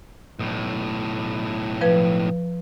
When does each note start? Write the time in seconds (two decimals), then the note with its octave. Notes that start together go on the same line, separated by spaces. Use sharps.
0.39 B1 A2
1.81 F3 B4